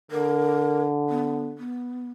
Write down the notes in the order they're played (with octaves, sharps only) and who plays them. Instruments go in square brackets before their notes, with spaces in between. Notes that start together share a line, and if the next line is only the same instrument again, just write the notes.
[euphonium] D3 [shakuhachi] A#4
[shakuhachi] B3
B3